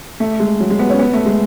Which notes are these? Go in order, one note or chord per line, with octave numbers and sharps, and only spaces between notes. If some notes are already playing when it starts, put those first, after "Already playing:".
A3
G#3
F#3
G#3
B3
C#4
B3
A3
G#3